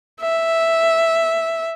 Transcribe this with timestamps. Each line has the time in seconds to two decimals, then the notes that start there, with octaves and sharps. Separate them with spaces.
0.21 E5